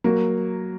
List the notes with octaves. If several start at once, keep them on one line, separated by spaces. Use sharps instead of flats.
F#3 A#3